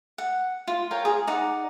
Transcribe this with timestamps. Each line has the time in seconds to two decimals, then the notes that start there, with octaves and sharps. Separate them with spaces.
0.18 F#5
0.68 F4
0.91 F4 A#4 C#5 G5
1.05 G#4
1.27 D#4 D5 F#5